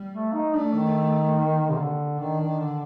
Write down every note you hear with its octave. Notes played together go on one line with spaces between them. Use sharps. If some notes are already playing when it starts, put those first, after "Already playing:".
Already playing: G3
A3
D#4
A3 D4
D#3
A#3
C3
D3
D#3 D4
D#3
D3